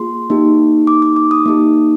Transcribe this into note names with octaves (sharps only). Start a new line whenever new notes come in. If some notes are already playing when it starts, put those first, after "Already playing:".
Already playing: A#3 F4 G#4 C6
A#3 D#4 G4
D6
D6
D6
D#6
A#3 D#4 G4